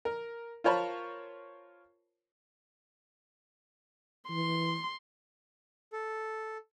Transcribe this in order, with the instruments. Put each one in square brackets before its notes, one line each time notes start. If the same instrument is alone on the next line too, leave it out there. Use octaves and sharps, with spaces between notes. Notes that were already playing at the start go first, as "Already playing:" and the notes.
[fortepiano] A#4
F4 A#4 C5 C#5 A5 B5
[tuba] E3 [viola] C6
[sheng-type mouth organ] A4